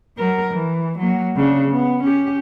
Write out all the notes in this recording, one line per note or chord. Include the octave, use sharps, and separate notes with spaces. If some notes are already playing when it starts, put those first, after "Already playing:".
F#3 A#4
E3
F#3 A#3
C#3 D4
B3
C#4 G4